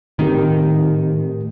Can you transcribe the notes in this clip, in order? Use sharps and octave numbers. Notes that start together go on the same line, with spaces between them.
A2 D#3 A3 C4 G4 A#4